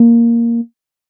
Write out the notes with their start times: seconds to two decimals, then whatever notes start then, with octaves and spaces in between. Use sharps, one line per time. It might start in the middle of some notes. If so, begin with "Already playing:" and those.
Already playing: A#3